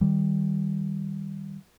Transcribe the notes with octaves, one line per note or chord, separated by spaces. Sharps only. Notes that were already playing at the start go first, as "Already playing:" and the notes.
D#3 G3